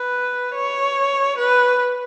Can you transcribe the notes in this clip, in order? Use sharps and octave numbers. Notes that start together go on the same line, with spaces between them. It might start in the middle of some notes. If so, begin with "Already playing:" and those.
Already playing: B4
C#5
B4